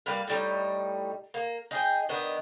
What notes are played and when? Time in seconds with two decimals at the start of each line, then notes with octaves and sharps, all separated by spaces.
0.06 G3 A#3 B4 F5
0.28 A2 G3 D#4
1.34 A#3
1.71 D#4 G#4 G5
2.09 D#3 B3 D4 D#5